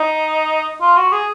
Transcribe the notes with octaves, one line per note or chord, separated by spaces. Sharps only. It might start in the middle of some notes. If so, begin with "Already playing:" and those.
Already playing: D#4
F4
F#4
G#4